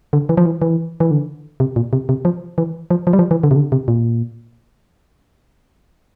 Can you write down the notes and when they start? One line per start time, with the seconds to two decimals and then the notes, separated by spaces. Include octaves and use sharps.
0.13 D3
0.29 E3
0.37 F3
0.46 E3
0.62 E3
1.00 E3
1.11 D3
1.60 C3
1.76 A#2
1.93 C3
2.09 C3
2.25 F3
2.58 E3
2.90 F3
3.07 F3
3.13 G3
3.19 F3
3.31 E3
3.43 D3
3.51 C3
3.56 D3
3.72 C3
3.88 A#2